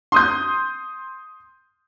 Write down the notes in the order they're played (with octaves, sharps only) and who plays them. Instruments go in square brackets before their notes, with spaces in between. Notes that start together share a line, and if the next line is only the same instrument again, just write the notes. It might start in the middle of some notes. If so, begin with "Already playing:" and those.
[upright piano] C6 D#6 G6